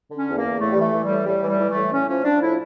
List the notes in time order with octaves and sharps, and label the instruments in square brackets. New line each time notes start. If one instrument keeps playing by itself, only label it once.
[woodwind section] D3 C#4
E2
A#3
E2
A2 A3
E3 G3
A3
E3
G3
A2
A2 G3
E3
G3
E3
A3
A2
A2 C#4
F3 C#4
F3 D4
A2 E4